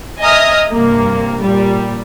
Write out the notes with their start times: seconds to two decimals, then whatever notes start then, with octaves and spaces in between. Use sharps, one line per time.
0.22 D#5 E5 G#5 A#5 D#6 F6
0.71 G2 C3 A#3
1.40 A#2 G3